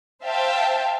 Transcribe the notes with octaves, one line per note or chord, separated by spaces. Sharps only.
C5 E5 F5 G5 A5